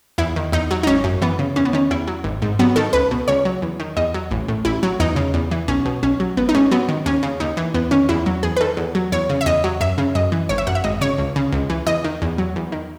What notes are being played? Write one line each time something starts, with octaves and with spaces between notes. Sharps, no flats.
E2 E4
D#3
E2 D#4
F#3
D#4
G#1 C#4
F#2
E3 B3
C#3
E2 C#4
B3
D#3 C#4
E2 E4
F#3
G#1
G#2
F#3 B3
D#3 A4
C#2 B4
B2
C#2 C#5
F#3
E2
D#3
E2 D#5
F#3
A1
A2
A1 E4
F#3
E2 D#4
C#3
E2
E3
B1 C#4
B2
B1 C#4
F#3
G#1 B3
D#4
G#2 C#4
F#3 B3
D#3
D#2 C#4
C#3
D#2 D#4
E3
E2 B3
D#3 C#4
E2 E4
F#3
E2 G#4
B4
D#3 A4
E2
F#3
E2 C#5
C#3
E5
E2 D#5
F#3
F#2 E5
C#3
F#2 D#5
E3
G#1 C#5
E5
F#2 F#5
E5
G#1 D#5
C#3 C#5
C#2
C#3
C#2
E3
E2 D#5
D#3
E2
F#3
E2
D#3